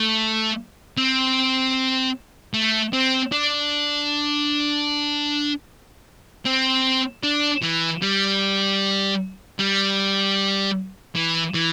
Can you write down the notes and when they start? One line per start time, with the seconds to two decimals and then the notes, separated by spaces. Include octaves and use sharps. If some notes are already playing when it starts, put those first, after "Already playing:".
Already playing: A3
0.97 C4
2.54 A3
2.93 C4
3.32 D4
6.45 C4
7.23 D4
7.63 E3
8.02 G3
9.59 G3
11.15 E3
11.54 E3